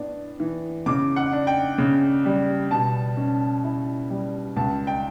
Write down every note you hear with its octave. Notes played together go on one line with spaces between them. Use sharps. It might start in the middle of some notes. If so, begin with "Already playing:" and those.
Already playing: A2 B3 D4
E3
C#3 D6
F#5
D4
G5
C#3
G3
B2 A5
C#4
E4
G3
C#2 A5
G5